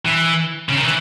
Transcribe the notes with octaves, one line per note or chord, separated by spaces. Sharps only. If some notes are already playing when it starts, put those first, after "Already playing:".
E3
C#3
D#3
E3